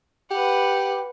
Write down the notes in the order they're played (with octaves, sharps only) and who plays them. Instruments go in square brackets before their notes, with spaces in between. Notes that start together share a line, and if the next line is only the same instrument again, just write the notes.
[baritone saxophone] G4 [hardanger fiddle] B4 F#5